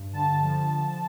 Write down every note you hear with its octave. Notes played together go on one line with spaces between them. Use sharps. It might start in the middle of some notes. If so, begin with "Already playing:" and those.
Already playing: G2
D3 A5
F3